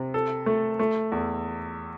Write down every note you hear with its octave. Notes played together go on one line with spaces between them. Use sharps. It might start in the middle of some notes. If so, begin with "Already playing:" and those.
Already playing: C3
A4
A3
A3
E2